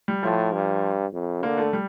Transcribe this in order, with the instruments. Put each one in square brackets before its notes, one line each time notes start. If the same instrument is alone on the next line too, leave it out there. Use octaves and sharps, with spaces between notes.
[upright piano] G3
[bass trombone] A2 [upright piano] F3
[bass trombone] G2
F2
[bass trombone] D3 [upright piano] A#3
[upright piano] A3
G3